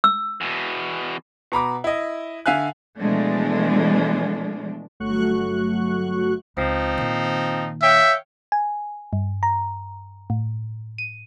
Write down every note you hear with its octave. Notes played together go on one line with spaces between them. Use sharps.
E6
E2 B2
B2 A#5 B5 D6
E4 D#5
D3 E5 F5 G#5 F#6
B2 E3 F3 G#3 A3 D4
G1 F#3 A3 F#4 C#6 F#6
C#2 F3 C4 D#4
A#2 D#3
C#5 E5 F5 G5
G#5
G2
A#5
A2
D#7